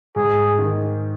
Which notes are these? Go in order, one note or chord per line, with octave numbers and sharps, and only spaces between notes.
G#2 G#4
D#3